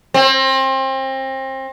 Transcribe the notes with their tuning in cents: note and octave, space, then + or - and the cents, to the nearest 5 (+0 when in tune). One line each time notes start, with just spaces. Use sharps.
C4 +30